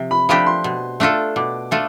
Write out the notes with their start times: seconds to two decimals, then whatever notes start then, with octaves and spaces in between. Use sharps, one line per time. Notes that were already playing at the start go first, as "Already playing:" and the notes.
Already playing: C3 F3
0.11 B5
0.29 F3 A3 D4 G4 B5
0.46 C6
0.64 B2
1.00 A3 D4 F4 A4
1.36 B2 D6
1.71 A3 D4 F4 A4